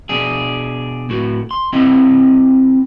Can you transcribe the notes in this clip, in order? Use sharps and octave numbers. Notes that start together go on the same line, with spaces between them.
B2 D4 G#4
A2 F#4
C6
C4 E4 G4 D#5